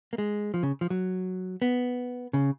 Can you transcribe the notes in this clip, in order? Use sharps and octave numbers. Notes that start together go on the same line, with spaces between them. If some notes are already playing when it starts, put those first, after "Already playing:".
A#3
G#3
F3
C#3
F3
F#3
B3
C#3